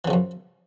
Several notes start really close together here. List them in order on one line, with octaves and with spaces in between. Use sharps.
E3 C#3 F3 F#2